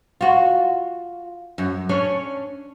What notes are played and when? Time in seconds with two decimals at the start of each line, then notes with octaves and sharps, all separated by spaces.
0.21 F4 F#4
1.58 F#2
1.89 C#4 D4 C#5